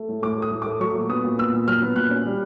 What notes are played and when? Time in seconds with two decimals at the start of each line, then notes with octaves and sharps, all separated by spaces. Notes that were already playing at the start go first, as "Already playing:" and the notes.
Already playing: A3
0.09 A2
0.23 A2 D6
0.38 A3 D#6
0.51 A2
0.62 D6
0.66 A3
0.80 F#3 C#6
0.95 A#2
1.09 B3 D#6
1.24 A#2
1.38 B3 E6
1.53 A#2
1.67 F#3 F6
1.82 B3
1.96 A#2 F#6
2.10 C#4
2.25 G3